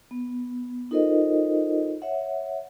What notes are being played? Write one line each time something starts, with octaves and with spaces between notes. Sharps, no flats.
B3
D#4 F4 A4 A#4 C5 D#5
C#5 E5 F#5